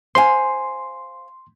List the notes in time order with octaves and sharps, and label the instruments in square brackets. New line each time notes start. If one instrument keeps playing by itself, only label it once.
[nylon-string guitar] C5 F5 G#5 [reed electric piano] C6